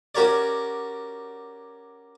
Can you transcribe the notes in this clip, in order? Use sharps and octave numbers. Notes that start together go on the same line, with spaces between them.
C#4 F#4 G4 A#4 C#5 D5